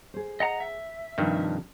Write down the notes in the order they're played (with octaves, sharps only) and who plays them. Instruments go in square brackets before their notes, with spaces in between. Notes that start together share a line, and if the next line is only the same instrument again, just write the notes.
[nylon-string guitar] G#4 C5
[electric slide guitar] D#5 F#5 A#5
E5
[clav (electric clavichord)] G2 D#3 [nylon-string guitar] C3 F3 D4